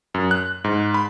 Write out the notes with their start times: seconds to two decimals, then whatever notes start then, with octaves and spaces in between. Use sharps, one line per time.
0.14 F#2
0.31 F#6
0.64 G#2
0.94 B5